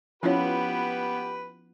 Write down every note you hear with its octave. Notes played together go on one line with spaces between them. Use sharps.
F3 B3 C#4 E4 F4 G4 B4 C#5